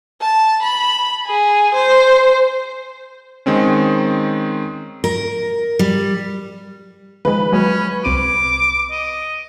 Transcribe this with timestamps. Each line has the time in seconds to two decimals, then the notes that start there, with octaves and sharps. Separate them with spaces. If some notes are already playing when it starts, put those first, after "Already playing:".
0.21 A5
0.63 B5
1.26 G#4
1.74 C5
3.46 D#3 G#3 C4 C#4
5.04 A#4
5.79 G3
7.25 D#3 F3 G#3 B4
7.52 F#3 G#3 A#3 C#4
8.05 C2 C4 D6 D#7
8.91 D#5